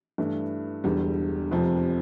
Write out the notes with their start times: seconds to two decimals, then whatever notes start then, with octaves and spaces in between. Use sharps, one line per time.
0.18 G2 E3 A3 E4
0.84 E1 E2 D3 G3
1.51 F1 F2 C3 F3